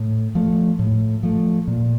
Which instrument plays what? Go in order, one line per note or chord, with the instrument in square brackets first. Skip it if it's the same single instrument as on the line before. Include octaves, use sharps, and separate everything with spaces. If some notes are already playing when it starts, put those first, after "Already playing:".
Already playing: [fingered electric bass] A2
F3 A3
A2
F3 A3
A#2